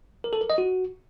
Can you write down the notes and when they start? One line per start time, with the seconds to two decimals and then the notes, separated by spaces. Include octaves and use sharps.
0.24 A#4
0.33 A4
0.41 A#4
0.50 D#5
0.58 F#4